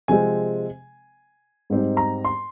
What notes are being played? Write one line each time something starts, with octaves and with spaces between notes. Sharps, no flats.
C3 F3 G#3 C4 G#5
G#2 G3 C4 D#4
A#5
C6